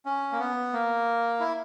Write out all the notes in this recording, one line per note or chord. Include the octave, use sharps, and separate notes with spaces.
C#4
A#3
B3
A#3
E4